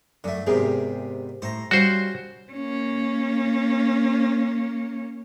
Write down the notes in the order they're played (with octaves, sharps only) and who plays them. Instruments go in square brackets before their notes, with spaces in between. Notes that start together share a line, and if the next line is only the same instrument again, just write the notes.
[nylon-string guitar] F#2 [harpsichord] D3 A3
[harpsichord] E2 G#2 C3 [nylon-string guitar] G4 G#4 A#4
[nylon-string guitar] A2 [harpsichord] C5 A#5
[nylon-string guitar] G3 [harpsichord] C#4 F4 [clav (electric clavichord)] F#4 C5
[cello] A#3 C#4